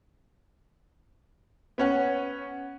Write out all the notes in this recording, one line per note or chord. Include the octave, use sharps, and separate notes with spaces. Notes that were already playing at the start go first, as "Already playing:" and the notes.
B3 C#4 F#5